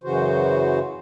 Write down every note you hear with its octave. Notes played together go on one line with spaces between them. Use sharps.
F#2 C#3 E3 F#4 C5